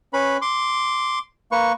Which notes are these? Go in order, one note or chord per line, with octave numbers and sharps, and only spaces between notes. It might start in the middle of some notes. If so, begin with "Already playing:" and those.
C#4 B4 B5
C6 D6
A#3 B4 C#6